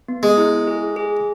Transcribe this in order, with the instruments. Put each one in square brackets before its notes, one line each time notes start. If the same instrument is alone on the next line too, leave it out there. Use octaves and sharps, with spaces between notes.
[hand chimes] B3
[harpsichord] G#3
[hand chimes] E4
G#4
G#4